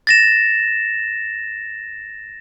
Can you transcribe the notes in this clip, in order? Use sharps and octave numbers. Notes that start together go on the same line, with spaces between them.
A6 A#6 E7